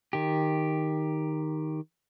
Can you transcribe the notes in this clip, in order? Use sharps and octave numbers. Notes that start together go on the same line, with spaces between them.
D#3 G4